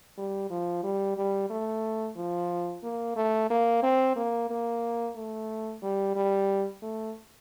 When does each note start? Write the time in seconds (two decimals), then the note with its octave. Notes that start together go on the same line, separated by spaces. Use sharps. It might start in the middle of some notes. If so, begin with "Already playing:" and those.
0.18 G3
0.50 F3
0.83 G3
1.17 G3
1.50 A3
2.17 F3
2.83 A#3
3.16 A3
3.50 A#3
3.83 C4
4.16 A#3
4.50 A#3
5.16 A3
5.82 G3
6.16 G3
6.83 A3